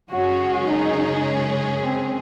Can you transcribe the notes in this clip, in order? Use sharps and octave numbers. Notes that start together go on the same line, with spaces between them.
F#2 C#3 G#3 C#4 F#4 G#4
D#4
C4